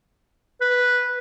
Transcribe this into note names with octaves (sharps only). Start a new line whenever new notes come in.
B4